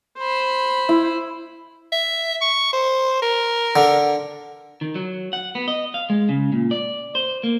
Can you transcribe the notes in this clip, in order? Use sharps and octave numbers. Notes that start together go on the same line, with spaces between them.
C5 B5
E4
E5
C#6
C5
A#4
D3
D#3
F#3
F#5
B3
D#5
F5
G#3
C#3
A#2
D5
C5
A#3